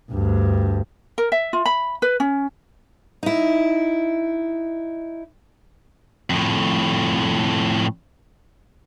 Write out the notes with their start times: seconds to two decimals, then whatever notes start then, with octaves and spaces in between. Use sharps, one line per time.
0.12 D2 G2
1.18 A#4
1.32 E5
1.53 F4
1.66 B5
2.02 B4
2.20 C#4
3.23 D#4 E4
6.30 F2 A2